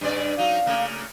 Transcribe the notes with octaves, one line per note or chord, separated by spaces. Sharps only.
G2 C#3 D5
F#3 D#4 F5
C#3 A3 A#3